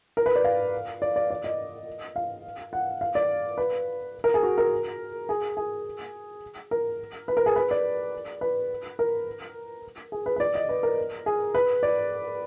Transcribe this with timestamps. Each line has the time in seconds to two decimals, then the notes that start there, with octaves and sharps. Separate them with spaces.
0.17 A#4
0.26 B4
0.35 D5
0.44 F5
1.02 D5
1.16 D5
1.30 D5
1.44 D#5
2.16 F5
2.73 F#5
3.01 F5
3.15 D5
3.58 B4
4.24 A#4
4.34 G#4
4.43 F#4
4.58 A#4
5.29 G#4
5.57 G#4
6.71 A#4
7.28 B4
7.37 A#4
7.46 G#4
7.56 B4
7.71 D5
8.41 B4
8.99 A#4
10.12 G#4
10.26 B4
10.36 B4
10.40 D5
10.55 D#5
10.69 B4
10.83 A#4
11.26 G#4
11.55 B4
11.83 D5